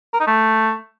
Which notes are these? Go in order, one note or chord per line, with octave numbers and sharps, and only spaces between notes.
A#4
D#4
A3